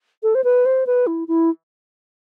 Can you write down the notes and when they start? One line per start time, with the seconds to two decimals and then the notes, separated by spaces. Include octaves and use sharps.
0.23 A4
0.35 C5
0.44 B4
0.65 C5
0.86 B4
1.07 E4
1.28 E4